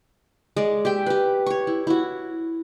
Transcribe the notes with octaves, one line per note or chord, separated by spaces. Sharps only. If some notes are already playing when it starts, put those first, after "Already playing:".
G#3 D5
G4 E5 G5
G4 B4
C#5 C#6
E4
E4 F#4